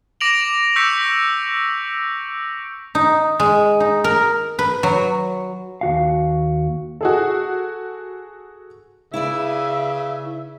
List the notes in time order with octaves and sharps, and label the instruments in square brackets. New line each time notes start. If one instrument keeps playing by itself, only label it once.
[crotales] D6 A#6 D7 F7 F#7
C#6 E6 G6 B6 C#7
[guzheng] D#4
G#3
D#4
A#4
B4
F#3
[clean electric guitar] D#2 F#4 F5
[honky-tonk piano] F#4 G#4 A4
[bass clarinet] C#3 [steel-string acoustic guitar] E4 B4 D5 [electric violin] E5